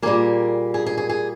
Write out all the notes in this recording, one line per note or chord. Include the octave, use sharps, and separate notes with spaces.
A#2 G3 A#3 G#4
G#4
G#4
G#4
G#4